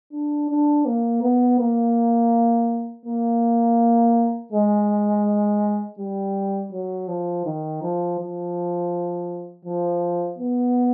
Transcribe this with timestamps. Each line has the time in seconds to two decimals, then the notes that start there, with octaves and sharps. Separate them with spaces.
0.13 D4
0.50 D4
0.86 A#3
1.22 B3
1.60 A#3
3.06 A#3
4.53 G#3
5.99 G3
6.72 F#3
7.08 F3
7.46 D#3
7.82 F3
8.19 F3
9.65 F3
10.38 B3